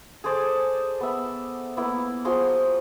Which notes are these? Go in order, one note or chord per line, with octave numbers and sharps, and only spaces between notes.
G#4 A4 C5 D5
B3 E5
A#3 B3 E4
F3 F#4 G#4 C6